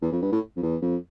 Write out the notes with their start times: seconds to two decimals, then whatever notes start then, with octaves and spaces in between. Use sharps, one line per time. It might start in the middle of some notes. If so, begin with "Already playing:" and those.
0.02 E2
0.12 F2
0.22 G2
0.32 A2
0.56 F2
0.62 E2
0.82 F2